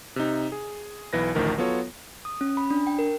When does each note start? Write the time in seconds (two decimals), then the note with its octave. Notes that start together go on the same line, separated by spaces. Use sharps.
0.16 C3 D#4
0.52 G#4
1.13 B1 E3 B4 A#6
1.35 A1 D2 D#3 F3 A#4
1.58 F#3 B3 F4 A4 C#5
2.25 D#6
2.41 C#4
2.57 B5
2.71 D4
2.87 G5
2.99 A#4